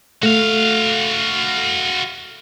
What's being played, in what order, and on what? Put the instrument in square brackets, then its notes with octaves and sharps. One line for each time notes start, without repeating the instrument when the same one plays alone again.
[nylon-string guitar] A3 [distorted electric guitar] F#4 F5